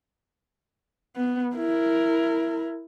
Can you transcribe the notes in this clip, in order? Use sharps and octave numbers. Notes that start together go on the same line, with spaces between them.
B3
E4 A#4